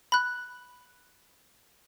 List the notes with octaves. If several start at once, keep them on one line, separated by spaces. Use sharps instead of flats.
B5 F#6